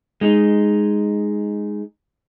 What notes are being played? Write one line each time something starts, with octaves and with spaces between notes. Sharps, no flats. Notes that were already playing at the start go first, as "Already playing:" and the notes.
G#3 D#4